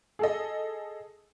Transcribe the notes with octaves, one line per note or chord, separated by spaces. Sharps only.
G#4 A4 D#5